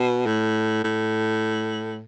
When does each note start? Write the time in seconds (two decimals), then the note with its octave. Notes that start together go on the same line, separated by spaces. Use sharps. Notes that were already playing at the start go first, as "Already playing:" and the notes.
Already playing: B2
0.26 A2
0.84 A2